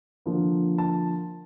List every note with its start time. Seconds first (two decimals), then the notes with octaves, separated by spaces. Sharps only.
0.26 D3 F3 A#3
0.78 A5